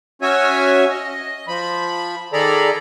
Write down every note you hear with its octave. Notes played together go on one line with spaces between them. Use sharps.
C#4 F#4 C#5 E5 G#5
D#5
F3 B5
D#3 G#4 A4 D5 A#5 B5